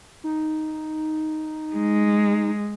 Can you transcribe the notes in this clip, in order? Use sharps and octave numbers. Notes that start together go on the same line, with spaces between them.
D#4
G#3